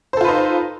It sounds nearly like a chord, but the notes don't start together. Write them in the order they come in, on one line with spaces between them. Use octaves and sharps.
C5 A4 F4 B4 D#4